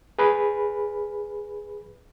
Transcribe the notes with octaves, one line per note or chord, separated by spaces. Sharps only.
G#4 B4 B5